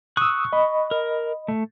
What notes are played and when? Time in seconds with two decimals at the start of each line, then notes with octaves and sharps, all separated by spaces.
0.17 C#6 D#6 E6 F#6
0.53 D#5 B5
0.91 A#4
1.48 A3